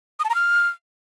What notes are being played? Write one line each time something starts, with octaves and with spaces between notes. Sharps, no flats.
D#6
A5
A#5
F6